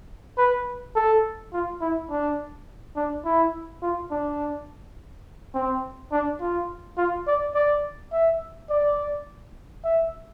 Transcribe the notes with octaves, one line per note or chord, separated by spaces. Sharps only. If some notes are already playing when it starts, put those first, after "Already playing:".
B4
A4
F4
E4
D4
D4
E4
F4
D4
C4
D4
F4
F4
D5
D5
E5
D5
E5